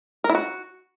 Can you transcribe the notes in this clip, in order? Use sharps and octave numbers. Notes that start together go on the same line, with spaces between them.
A#4
E4
F#4